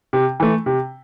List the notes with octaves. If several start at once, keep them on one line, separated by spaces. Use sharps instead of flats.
C3
E3 A3
C3